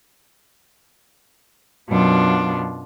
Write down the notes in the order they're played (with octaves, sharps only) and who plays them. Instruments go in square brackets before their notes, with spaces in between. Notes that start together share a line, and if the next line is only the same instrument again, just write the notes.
[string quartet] F#2 B2 F#3 B3 D4 F4